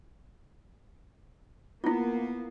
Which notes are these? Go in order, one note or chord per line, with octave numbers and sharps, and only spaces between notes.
A#3 B3 E4 F4